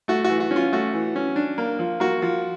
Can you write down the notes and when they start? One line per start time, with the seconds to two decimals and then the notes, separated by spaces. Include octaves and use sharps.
0.08 A3 F#4
0.24 E3 F#4
0.40 F#4
0.51 C#4
0.56 F4
0.73 A3 F#4
0.94 E3
1.16 C#4
1.36 D4
1.58 A#3
1.79 F3
2.00 A#3 F#4
2.22 F3